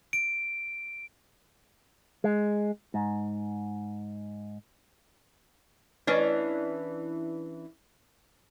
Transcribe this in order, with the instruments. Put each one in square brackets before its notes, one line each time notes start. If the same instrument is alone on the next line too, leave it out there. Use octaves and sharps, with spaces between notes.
[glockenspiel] D7
[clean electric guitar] G#3
G#2
[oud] E3 C#4 D4